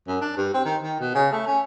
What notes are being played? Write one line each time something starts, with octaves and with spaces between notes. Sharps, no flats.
F#2
D4
G2
C4
D#3
D#3
B2
C#3
A3
C#4